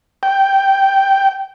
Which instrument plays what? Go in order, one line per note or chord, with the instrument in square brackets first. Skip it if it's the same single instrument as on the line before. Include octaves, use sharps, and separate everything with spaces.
[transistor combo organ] G5